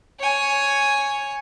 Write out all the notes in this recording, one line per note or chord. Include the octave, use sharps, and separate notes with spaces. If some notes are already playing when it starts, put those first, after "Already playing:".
C#5 G#5